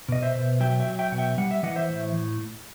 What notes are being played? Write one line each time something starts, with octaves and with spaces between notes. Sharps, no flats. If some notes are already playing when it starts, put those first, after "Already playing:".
B2 D#5
C5 E5
B2
F#3 E5 G5
E5 G5
F#3
E5 G5
B2 F#5
E5 G5
G3 F#5
E5
E3 D#5 F#5
C5 E5
A2